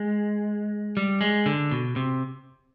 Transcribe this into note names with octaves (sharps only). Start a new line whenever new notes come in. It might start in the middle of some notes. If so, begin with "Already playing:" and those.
Already playing: G#3
G3
G#3
D3
B2
C3